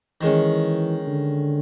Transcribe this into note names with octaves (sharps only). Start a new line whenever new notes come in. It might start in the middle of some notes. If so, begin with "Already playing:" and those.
D#3 E3 G#3 C#4
D3